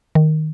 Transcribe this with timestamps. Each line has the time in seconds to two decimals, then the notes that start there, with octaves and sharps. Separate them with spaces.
0.15 D#3